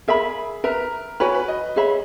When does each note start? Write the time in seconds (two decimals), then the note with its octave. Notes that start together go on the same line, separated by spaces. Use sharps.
0.08 G#4 A#4 E5 B5
0.64 A#4 B4 E5 A#5
1.20 F#4 B4 C#5 G#5 B5
1.34 B4
1.48 D#5
1.76 G#4 C#5 E5 B5